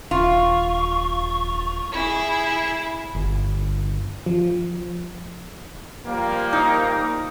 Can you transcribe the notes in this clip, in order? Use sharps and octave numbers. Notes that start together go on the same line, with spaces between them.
D#1 F4 C#6
E4 G#4
G1
F3
F3 G3 A#3
D#4